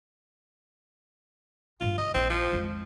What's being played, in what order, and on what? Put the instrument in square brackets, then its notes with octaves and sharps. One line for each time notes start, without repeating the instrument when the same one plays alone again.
[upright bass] G2 A#2 [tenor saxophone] F4
[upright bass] C3 [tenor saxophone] D#5
[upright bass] A#1 E4 [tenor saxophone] C4
[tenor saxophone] F3
[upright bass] F2 G#3